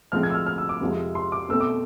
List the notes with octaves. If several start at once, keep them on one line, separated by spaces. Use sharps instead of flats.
A2 F3 G#3 C4 F6
G#6
E6
F6
F6
E6
D6
F2 C3 F3 G#3
C6
D6
B2 A3 C4 E6
D6